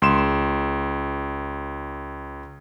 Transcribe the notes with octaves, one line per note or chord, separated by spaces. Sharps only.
C#2 C6 E7